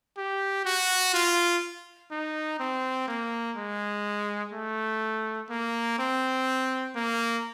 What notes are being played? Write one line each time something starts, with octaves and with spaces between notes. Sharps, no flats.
G4
F#4
F4
D#4
C4
A#3
G#3
A3
A#3
C4
A#3